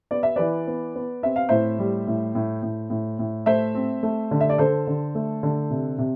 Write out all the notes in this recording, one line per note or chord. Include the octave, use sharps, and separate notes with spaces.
B3 D5
E5
E3 B4 D5
B3
B3
C4 E5
F5
A2 C5 E5
G3
A2
A2
A2
A2
A2
A3 C5 E5
C4
A3
D3
E5
D5
D3 A4 C5
D3
A3
D3
C3
C3